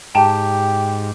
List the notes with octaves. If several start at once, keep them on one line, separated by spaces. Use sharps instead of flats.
G#2 G4 G5 A5 A#5